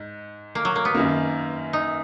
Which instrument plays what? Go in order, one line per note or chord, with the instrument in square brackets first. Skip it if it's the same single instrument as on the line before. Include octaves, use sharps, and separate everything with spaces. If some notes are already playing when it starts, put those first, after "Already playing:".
Already playing: [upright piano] G#2
[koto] A#3
F#3
A#3
B3
[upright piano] F#2 D#3 A#3
[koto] D#4